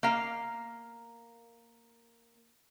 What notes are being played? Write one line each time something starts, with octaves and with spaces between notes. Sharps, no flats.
A#3 F5